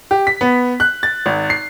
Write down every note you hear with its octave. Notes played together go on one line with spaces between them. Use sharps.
G4
B6
B3
F#6
A6
G#1
C7